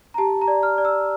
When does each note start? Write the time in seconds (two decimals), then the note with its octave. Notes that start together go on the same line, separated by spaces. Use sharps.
0.14 A#5
0.18 G4 A5
0.41 A#5
0.48 D5
0.63 F6
0.78 D5
0.85 E6